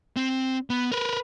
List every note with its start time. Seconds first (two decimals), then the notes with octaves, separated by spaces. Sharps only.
0.16 C4
0.70 B3
0.92 A#4 B4